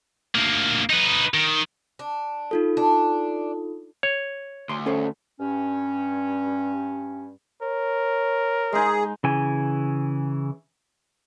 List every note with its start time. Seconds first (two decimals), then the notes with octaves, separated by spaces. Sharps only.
0.35 D2 A#3
0.89 D#4 B4
1.34 D#3
1.99 D4
2.51 D#4 F4 A4
2.77 D4
4.03 C#5
4.69 D2 C6
4.86 C#4 A4 C5
5.40 G2 C#4
7.63 A#4 C#5
8.72 G#3 D#4 G#4
9.23 C#3 E3 G#5